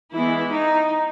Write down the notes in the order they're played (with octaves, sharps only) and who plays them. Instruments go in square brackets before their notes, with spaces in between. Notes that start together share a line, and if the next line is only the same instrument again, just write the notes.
[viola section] E3 G#3 B3 E4
D#4